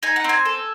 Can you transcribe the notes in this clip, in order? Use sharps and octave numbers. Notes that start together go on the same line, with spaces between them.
D#4 G#5
F#5
C4 G#5
A4